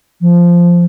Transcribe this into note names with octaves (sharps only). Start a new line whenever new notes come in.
F3